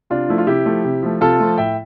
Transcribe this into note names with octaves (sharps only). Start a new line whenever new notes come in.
C3 D4 F4
F3 A3 E4
F4
C3 E4 G4
F3 A3
C3
F3 A3
C3 F4 A4
F3 A3
A2 E5 G5